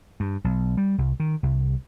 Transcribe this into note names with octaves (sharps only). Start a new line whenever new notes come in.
G2
B1
G3
C2
D#3
C2